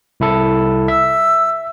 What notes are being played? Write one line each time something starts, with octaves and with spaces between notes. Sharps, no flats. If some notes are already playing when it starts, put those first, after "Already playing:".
C2 E4 A4
E5 E6